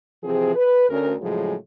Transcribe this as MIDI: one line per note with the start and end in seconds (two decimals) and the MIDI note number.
0.23 0.53 48
0.23 0.53 52
0.23 0.53 53
0.23 0.53 60
0.23 0.53 68
0.55 0.89 71
0.89 1.14 38
0.89 1.14 61
0.89 1.14 70
1.21 1.54 45
1.21 1.54 49
1.21 1.54 53
1.21 1.54 54
1.21 1.54 56
1.21 1.54 68